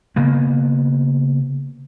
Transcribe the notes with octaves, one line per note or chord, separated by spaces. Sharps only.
C#3 A#3 B3